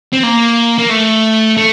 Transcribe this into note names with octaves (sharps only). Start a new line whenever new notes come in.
C4
A#3
A#3
A3
A3